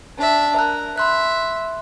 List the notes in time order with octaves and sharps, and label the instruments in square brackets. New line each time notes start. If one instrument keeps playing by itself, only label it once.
[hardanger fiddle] D4 E5
[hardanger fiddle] A#4 [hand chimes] A5 F#6
[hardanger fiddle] E5 [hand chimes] B5 C6 F#6